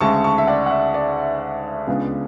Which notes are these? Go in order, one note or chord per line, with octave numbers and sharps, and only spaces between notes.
D2 C#3 G#3 A5 C#6
A5 C#6
E5
D5 F#5
F#5
E5
D5
C#2 C#3 G#3 B3 D4